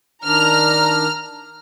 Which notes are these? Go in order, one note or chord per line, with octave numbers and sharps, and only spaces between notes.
D#3 D4 A#5 F6